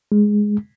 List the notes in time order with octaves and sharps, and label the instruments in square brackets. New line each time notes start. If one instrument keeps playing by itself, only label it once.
[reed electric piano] G#3